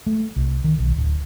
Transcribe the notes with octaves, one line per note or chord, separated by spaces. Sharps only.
A3
C2
D#3
B1
D1